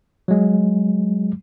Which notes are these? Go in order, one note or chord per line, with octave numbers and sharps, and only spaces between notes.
F#3 G#3